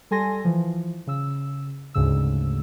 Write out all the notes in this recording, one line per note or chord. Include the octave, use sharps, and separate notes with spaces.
G3 A4 G#5 C6 A#6
E3 F3
C#3 E6
D2 G#2 C#3 E6